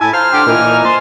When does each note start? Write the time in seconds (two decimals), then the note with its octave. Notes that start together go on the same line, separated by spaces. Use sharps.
0.01 A2 E4 G#5 A5
0.13 F4 C5 A#5 F6
0.33 D3 G4 G5
0.47 A#2 E3 D#4 A#4 G#5
0.85 C5 A5